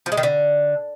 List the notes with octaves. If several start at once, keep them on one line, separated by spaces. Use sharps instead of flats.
F3
G#3
D#3
D3